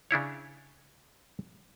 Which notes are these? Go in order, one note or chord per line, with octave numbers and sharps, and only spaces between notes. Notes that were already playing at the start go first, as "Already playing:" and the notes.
C#3 D4 E4 C#5